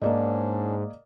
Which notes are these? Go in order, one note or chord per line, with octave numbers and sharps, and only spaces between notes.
G#2 A#3 C#4 D4 D5 D#5